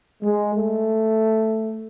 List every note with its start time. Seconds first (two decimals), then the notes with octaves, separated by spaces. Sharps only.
0.23 G#3
0.53 A3